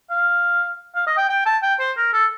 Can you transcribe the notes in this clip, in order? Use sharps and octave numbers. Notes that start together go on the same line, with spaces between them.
F5
F5
D#5
G5
G5
A5
G5
C5
A#4
A4